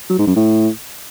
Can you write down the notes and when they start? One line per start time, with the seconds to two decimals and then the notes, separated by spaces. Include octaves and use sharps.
0.10 F#3
0.18 G#2
0.27 F#2
0.36 A2